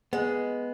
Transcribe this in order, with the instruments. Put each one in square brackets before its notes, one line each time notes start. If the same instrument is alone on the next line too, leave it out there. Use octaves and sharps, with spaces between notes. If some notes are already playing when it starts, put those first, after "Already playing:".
[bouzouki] G#3 [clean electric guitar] B3